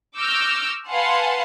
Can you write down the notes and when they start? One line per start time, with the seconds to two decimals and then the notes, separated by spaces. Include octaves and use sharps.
0.17 C#6 D6 E6 F6 G6 A#6
0.89 B4 F5 F#5 G#5 A5 C6